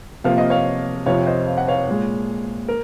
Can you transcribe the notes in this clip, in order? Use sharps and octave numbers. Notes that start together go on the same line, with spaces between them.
C3 F3 A#3 F5
D#5
C#5 F5
F2 C3 F3 C#5 F5
C5 D#5
F5
F#5
C#5 F5
A#2 G#3
A#4